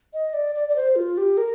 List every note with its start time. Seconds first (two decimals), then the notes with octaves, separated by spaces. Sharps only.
0.14 D#5
0.34 D5
0.55 D5
0.68 D5
0.76 C5
0.96 F4
1.17 G4
1.37 A#4